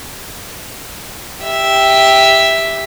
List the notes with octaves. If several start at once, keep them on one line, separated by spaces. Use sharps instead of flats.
G4 E5